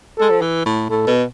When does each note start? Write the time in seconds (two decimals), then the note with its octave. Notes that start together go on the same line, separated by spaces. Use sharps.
0.18 G#3 A4
0.31 F3
0.41 E3
0.66 A2
0.89 A2 A4
1.07 B2